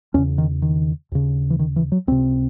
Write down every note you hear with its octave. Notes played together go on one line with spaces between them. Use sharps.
E2 C#3 C#4
D#3
D#3
D#2 C#3
E3
D#3
E3
F#3
C#2 C3 C4